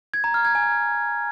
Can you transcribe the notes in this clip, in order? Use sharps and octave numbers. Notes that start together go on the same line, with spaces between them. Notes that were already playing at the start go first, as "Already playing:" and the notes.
G#6
A#5
F6
G#6
G#5